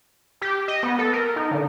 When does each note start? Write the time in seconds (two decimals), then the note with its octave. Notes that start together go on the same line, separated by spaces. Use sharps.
0.41 G4
0.68 D#5
0.83 B3
0.99 A4
1.13 A#4
1.36 D#4
1.51 D3